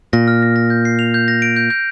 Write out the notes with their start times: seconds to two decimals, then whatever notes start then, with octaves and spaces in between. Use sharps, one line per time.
0.13 A#2 A#6
0.28 F6
0.42 A#6
0.56 A#6
0.70 G6
0.85 C7
0.99 F7
1.14 G6
1.28 A#6
1.42 D7
1.56 G6
1.70 G6